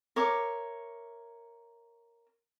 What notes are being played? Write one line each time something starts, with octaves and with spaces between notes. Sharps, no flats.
A#4 C#5 E5 D6